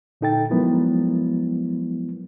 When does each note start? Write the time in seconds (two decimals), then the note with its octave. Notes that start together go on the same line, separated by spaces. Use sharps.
0.21 A#2 D3 D#4 A4 G5 A6
0.50 F3 F#3 G#3 B3 E4 A#4